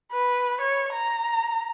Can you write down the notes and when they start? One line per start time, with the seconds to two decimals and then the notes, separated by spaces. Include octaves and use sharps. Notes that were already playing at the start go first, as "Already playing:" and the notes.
0.12 B4
0.61 C#5
0.93 A#5